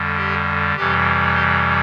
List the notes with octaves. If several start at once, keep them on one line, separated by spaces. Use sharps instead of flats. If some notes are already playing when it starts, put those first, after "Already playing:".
Already playing: F2 D3 G3
G4
F2 C3 E3 G3 G4
G4